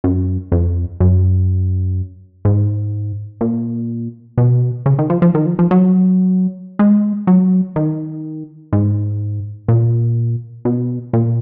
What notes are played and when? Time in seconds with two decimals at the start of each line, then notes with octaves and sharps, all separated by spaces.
0.04 F#2
0.52 F2
1.00 F#2
2.45 G#2
3.41 A#2
4.38 B2
4.86 C#3
4.99 D#3
5.10 F3
5.22 F3
5.35 D#3
5.46 F3
5.59 F3
5.71 F#3
6.79 G#3
7.27 F#3
7.76 D#3
8.73 G#2
9.68 A#2
10.65 B2
11.13 A#2